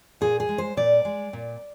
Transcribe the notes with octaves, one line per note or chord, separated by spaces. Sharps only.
A#2 G#4
G#4
G#3
C5
A#2 D5
G#3
A#2